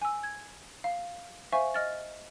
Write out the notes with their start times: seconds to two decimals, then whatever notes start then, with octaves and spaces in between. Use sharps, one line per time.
0.02 G#5 E6
0.23 G#6
0.84 F5
1.52 C5 E5 F5 G#5 C#6
1.74 D#5 F6 A6